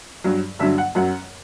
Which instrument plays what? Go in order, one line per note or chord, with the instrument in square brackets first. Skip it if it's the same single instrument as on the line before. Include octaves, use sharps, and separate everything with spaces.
[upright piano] G2 F#3
G2 D3 F#3 E5
F#5
F#2 F#3 F#5